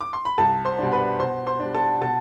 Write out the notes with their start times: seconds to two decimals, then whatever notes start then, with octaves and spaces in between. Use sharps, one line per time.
0.01 D6
0.13 C6
0.25 B5
0.38 C2 A4 A5
0.65 C5 C6
0.79 B2 G3 D4
0.92 B4 B5
1.19 B2 C5 C6
1.46 C5 C6
1.60 G3 D4
1.74 A4 A5
2.01 B2 A4 A5